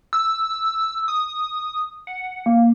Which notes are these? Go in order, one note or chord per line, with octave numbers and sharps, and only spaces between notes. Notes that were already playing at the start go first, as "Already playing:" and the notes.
E6
D#6
F#5
A#3